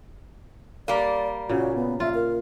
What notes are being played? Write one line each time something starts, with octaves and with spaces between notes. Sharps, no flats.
G3 A#3 D5
A#2 C#3 F#4
B3
F4 E5
A#4